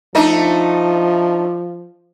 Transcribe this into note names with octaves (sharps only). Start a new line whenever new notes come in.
F3 A3 D4 D#4